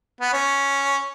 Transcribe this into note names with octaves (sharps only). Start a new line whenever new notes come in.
B3
C#4